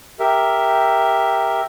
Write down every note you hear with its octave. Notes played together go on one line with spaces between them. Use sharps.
G4 A#4 E5